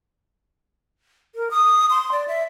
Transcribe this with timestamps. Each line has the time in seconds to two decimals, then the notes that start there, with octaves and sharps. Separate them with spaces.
1.35 A#4
1.51 D#6
1.90 C6
2.12 D5
2.28 E5